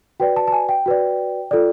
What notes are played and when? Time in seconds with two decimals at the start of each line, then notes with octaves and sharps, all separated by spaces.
0.20 F#4 B4 D5 G5
0.36 A5
0.48 A5
0.52 G#5
0.69 G5
0.86 F#4 B4 D5
1.51 F4 A4 D5